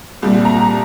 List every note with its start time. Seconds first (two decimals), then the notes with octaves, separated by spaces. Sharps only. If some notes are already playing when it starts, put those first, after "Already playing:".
0.22 C2 A#2 G3
0.45 A#5